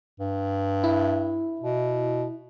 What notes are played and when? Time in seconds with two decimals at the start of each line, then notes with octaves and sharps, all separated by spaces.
0.20 G2
0.84 E4
1.61 B2